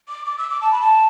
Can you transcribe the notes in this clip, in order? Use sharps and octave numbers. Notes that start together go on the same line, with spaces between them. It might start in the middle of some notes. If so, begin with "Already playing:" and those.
D6
D6
E6
D6
A5
B5
A5